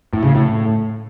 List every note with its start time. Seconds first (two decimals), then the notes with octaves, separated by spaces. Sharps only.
0.13 A2
0.24 C#3
0.35 A2